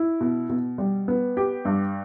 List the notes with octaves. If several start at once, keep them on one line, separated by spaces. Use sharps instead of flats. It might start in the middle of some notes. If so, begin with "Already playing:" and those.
Already playing: E4
B2
B2
G3
B3
G4
G2